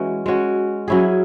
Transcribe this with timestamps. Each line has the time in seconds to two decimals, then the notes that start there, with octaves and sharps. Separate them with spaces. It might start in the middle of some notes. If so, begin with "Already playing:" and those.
Already playing: E3 G#3 C#4 F#4
0.26 G#3 C#4 F#4
0.88 F#3 C#4 E4 G#4